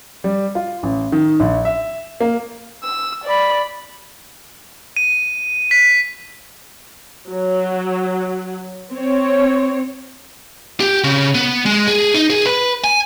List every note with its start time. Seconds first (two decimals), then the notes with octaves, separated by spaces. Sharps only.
0.24 G3
0.55 F4
0.83 A1
1.12 D#3
1.40 A#1
1.65 E5
2.20 A#3
2.84 E6
3.24 D5 B5
4.97 D#7
5.71 B6
7.30 F#3
8.91 C4 C#5
10.80 G4
11.04 C#3
11.35 B3
11.66 G#3
11.88 G#4
12.14 D#4
12.30 G#4
12.46 B4
12.84 G#5